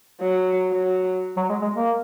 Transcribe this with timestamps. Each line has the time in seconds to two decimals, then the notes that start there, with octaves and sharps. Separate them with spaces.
0.21 F#3
0.72 F#3
1.37 F#3
1.49 G#3
1.62 G#3
1.75 A#3